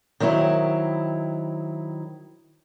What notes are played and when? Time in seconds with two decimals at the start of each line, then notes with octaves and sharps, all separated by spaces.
0.20 D#3 F#3 C4 E4